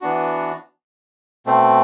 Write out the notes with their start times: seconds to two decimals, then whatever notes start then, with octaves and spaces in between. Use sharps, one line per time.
0.01 E3 B3 D4 F#4
1.46 B2 A3 C4